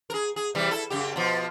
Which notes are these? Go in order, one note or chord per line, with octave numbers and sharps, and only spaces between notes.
G#4 A#4
G#4
C3 E3 G3
E4 A4
F#2 C#3 G4
B2 F3